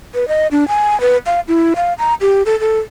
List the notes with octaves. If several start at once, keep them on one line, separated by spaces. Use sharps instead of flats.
B4
D#5
D4
G#5
B4
F5
E4
F5
A#5
G4
A4
A4